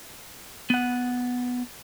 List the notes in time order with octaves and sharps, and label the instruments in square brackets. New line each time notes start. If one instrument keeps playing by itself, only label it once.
[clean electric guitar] B3 F#5